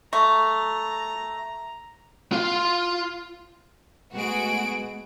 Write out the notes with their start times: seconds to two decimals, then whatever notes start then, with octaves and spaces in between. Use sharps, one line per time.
0.13 A3 A#5 C#6
2.32 F4 F5
4.14 G#3 A3 B3 F#4 G#4 D7